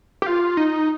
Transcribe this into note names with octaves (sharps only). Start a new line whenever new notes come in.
G4
F4
D#4